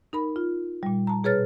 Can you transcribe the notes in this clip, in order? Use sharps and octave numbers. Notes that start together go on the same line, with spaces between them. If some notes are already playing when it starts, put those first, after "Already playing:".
D#4 A#4 B5
F4
A#2 G3
A5 A#5
B2 G#4 B4 C#5 F6 A6